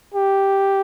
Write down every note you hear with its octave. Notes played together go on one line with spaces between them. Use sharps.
G4